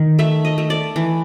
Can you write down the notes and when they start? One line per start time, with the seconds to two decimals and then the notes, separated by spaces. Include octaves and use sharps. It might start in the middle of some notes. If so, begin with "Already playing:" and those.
Already playing: D#3
0.19 A3 E5
0.45 D#5
0.58 A3
0.70 D5
0.96 E3